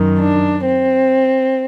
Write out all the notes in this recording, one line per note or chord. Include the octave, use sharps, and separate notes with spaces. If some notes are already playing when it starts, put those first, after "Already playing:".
Already playing: F#2 D#3
D4
C4